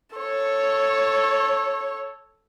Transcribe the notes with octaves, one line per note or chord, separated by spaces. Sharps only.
A4 C#5